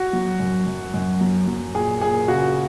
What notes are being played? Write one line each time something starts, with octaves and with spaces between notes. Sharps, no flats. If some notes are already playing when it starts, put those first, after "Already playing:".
Already playing: F#4
F#3
F#2
F#2
F#2
F#3
F#3
A#2 G#4
A#2 G#4
C#3 F#4